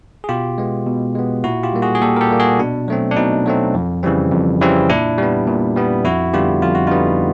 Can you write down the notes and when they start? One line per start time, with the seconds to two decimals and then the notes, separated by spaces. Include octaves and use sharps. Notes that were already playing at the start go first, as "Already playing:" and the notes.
0.24 G#4
0.29 B2 F4 G4
0.58 G#3 B3
0.87 B2
1.15 G#3 B3
1.44 A#2 E4 F#4
1.63 F4 G4
1.73 G3 A#3
1.82 F#4 G#4
1.95 G#4
2.02 A#2 G4 A4
2.16 A#4
2.21 G4 A4
2.30 G3 A#3
2.40 F#4 G#4
2.59 B2 D4
2.88 F#3 A3 C4
3.11 D4
3.16 B2 D#4
3.46 F#3 A3 C4
3.74 F2
4.03 C#3 E3 G3 C4
4.32 F2
4.61 C#3 E3 G3 C4
4.90 A#2 D4 E4
5.18 G3 B3
5.47 A#2
5.76 G3 B3
6.05 F2 E4 F#4
6.34 D3 G3 B3 F4 G4
6.62 F2 F4
6.75 F#4
6.87 D3 G3 B3 D#4 F4